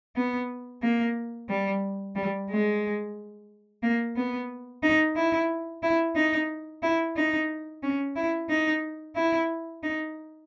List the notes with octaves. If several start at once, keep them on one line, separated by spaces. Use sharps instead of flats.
B3
A#3
G3
G3
G#3
A#3
B3
D#4
E4
E4
D#4
E4
D#4
C#4
E4
D#4
E4
D#4